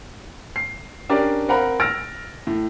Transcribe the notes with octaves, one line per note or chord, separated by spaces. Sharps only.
C7
C#4 D4 G4 A#4 D5
C4 A#4 F5 F#5 A#5 B5
E6 F6 A6 A#6 D7
A2